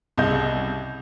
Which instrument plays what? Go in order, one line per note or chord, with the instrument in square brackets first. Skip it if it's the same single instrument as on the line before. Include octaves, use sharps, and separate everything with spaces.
[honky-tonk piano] C2 C#3 D#5 G6